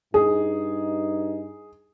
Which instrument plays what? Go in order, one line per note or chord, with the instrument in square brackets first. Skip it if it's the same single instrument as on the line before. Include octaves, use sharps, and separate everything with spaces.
[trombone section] G2 D#4 [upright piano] G#4